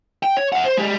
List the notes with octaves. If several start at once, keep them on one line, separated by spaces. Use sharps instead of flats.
G5
C#5
E5 F#5
C5
G3 G#3